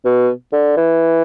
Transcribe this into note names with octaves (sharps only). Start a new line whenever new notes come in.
B2
D3
E3